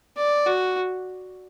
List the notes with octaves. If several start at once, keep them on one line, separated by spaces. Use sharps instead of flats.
D5
F#4